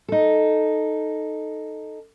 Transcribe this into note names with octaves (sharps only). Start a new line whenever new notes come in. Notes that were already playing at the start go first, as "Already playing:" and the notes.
D#4 A4